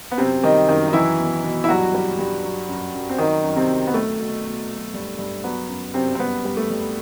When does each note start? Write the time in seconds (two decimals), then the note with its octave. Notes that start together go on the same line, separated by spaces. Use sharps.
0.11 B3
0.18 F#2 C3 C4
0.43 D#3 G3 D#4
0.68 F#2 D#3 D#4
0.88 D#4
0.93 E3 F#3 E4
1.19 B2
1.44 B2
1.64 E4
1.69 G2 F#3 F#4
1.94 G3
2.19 G2
2.44 F#3
2.69 F#2
2.94 F#2
3.09 C4
3.18 D#3 F#3 D#4
3.44 F#2
3.57 C3 C4
3.69 F#2
3.87 B3
3.94 F#3 A3
4.20 B2
4.44 B2
4.69 F#3
4.94 G2
5.19 G2
5.44 F#3 B3
5.69 F#2
5.94 F#2 C3 C4
6.15 C4
6.19 G2 B3
6.45 G3
6.57 A3
6.70 G2